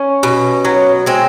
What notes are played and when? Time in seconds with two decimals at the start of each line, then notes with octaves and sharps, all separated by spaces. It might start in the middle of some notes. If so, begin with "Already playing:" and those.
Already playing: C#4
0.23 B2
0.65 F#3
1.06 G#3 C4